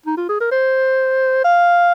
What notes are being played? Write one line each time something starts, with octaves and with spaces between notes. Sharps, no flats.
D#4
F4
G#4
A#4
C5
F5